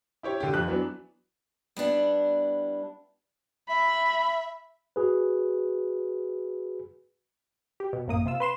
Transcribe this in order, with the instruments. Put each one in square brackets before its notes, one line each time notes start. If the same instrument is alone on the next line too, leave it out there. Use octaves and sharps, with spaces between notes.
[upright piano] E4 G4 C#5
D3 G4
F2 F3 F#6
E3 F#3 B3 D4
[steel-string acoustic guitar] G3 B3 D4 E4
[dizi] E5 [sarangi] B5
[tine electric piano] F#4 G#4 B4
[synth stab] G4
B2
A1 F#2 A#3 D#6
C3 F4 E6
B4 C6 E7